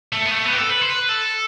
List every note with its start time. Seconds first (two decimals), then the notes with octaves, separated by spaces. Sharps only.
0.13 A3
0.26 B3
0.31 A3
0.45 B3
0.53 G4
0.57 A4
0.70 B4
0.82 C5
0.90 B4
1.09 A4